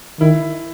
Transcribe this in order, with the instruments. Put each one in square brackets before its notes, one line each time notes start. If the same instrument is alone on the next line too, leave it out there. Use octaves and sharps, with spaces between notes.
[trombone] D#3 [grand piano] E4